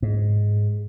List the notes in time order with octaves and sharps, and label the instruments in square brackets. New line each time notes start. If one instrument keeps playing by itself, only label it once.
[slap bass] G#2